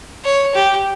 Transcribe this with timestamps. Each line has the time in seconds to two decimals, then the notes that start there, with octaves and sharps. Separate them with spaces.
0.25 C#5
0.54 G4